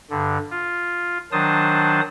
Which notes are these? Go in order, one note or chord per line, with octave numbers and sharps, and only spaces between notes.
G2 D3
F4
D#3 F#3 D4 C5 A5 D#6